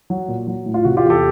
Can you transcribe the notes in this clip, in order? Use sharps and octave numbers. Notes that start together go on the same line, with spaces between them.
F#3
A#2
F#3
A2
F4
C3 F#4
F4 G4
E2
G4 A4